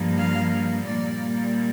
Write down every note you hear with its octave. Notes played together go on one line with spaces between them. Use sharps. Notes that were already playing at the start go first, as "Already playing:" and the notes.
Already playing: G2 F3 A#3
F5
A#2 G3 A#3 D5